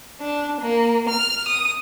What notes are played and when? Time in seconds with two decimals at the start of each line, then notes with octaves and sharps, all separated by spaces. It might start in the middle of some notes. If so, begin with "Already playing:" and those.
0.21 D4
0.61 A#3
1.09 F6
1.48 D#6